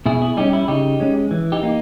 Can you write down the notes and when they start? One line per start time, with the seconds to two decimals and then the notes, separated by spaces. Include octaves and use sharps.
0.06 B2 E4 G#4
0.22 E4 G#4
0.37 G3 C#4 D#4 G4
0.53 E4
0.68 C#3 D#4 G4
1.00 G#3 C#4
1.31 E3
1.52 D#4 G4
1.63 A#3 D#4